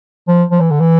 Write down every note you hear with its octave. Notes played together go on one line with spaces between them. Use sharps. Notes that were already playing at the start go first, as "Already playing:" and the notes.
F3
F3
E3
D3
E3